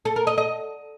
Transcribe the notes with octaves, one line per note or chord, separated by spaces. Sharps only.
A4
A#4
D#5
D#5